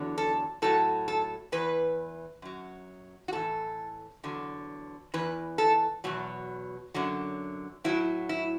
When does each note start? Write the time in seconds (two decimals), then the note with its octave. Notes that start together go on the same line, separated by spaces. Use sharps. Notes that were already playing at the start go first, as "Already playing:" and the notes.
Already playing: E2 D3 F#3
0.18 A4
0.62 A2 F#3 A4
1.08 A4
1.52 E2 E3 B4
2.42 F#2 F#3
3.28 F#4
3.33 A2 E3 A4
4.24 E2 D3 F#3
5.14 E2 E3 B4
5.58 A4
6.04 E2 B2 F#3
6.94 F#2 D3 F#3
7.84 A2 F#3 E4
8.29 E4